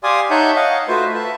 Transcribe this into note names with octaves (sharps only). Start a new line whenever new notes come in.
G4 D5 F5 G#5 C6 D#6
D#4 C#5 E5 F#5 A5 G6
D#5 F5 F#5
A3 F4 F#4 B4 C5 E5
B4 E5 A5